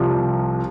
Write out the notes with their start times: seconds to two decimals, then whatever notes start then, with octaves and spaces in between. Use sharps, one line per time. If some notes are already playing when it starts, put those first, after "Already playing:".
Already playing: C2 C3 F3